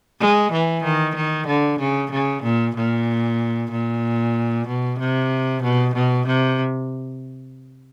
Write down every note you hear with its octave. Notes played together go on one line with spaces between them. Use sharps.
G#3
E3
D#3
D#3
D3
C#3
C#3
A#2
A#2
A#2
B2
C3
B2
B2
C3